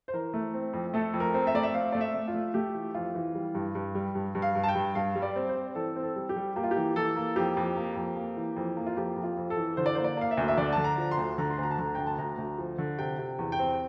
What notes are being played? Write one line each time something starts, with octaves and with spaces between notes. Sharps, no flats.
C5
E3 A#4
A3
C4
F2
A3 A4
F2
A#4
C4
E5
A3 D5
E5
C4 F5
A3 D5
E5
A3
F4
A3
A3 G4
E3
F2 F4
E3
G3
G2
G2
G3
G2
G2
F5
G2
A5
G5
G2
G2 F5
G3
D5
C4
C5
C4
E3 A4
C4
A4
G3
G4
G3
A#3 G4
F4
G4
E3
E3 A4
A#3
F2 G4
F2
A#3
F2
A#3
E3
F2
A#3
F4
F2 G4
F2
F4
F2
A4
E3
D3 C5
D5
A#3 C5
D5
A#3 F5
E5
D2
E5
D3 D5
D3 A5
A#5
F3
C6
D2
D3 A#5
C6
D2 A#5
A5
D3 A#5
D2 G5
A5
D2 A#5
D2
F3
D3
C3 G5
C3
E2
G5
C4